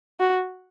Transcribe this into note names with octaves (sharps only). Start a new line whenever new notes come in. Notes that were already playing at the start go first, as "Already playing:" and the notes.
F#4